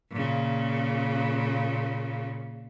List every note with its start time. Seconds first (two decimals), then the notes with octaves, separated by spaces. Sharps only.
0.11 A#2 C#3